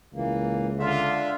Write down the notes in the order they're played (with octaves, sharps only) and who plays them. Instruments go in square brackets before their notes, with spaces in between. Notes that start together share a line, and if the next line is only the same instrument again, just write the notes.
[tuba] C#2 [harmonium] E3 A#3
[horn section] D3 [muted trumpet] F4 [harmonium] E5